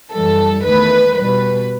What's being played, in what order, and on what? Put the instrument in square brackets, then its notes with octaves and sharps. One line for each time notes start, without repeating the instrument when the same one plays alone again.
[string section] F#2 E3 G3 A4
E2 D#3 A3 B4
B2 G3 B4